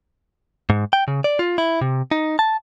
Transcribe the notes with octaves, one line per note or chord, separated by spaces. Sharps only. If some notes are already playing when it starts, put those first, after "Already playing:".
G#2
G5
C#3
D5
F4
E4
C3
D#4
A5